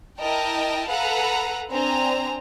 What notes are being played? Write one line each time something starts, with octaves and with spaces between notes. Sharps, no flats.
E4 A#4 D#5 G5 A5
A4 B4 F5 F#5 A#5 B5
C4 D4 G#5 A#5